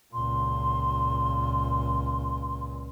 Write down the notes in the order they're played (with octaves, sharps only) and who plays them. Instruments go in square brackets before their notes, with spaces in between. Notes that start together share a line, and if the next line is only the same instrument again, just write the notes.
[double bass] C#2 A#2 [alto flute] C6